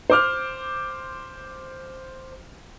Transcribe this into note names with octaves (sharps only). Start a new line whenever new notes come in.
C5 D6 F6